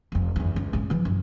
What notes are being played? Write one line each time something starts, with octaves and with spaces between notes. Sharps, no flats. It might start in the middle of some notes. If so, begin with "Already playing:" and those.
F1 F2
F#1 E2
C#2
G#2 C#3
E3 F3
F#2